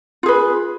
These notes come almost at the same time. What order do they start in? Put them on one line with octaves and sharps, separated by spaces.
F4 G#4 B4